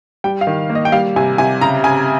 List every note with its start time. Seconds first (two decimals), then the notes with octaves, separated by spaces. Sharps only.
0.24 G3 G5
0.41 F5
0.47 D#3
0.70 A#3
0.75 D#5
0.85 G5
0.92 G3 F5
1.16 C3 G#5
1.38 C3 G#5
1.61 C#3 A#5
1.84 C#3 G#5